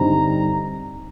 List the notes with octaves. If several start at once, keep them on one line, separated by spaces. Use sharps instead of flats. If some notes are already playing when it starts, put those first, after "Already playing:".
Already playing: G2 D3 G3 C4 D#4 A#5